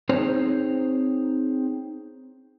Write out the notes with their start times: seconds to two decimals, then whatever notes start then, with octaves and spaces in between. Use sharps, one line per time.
0.09 C4 D#4 G#4 C5 C#5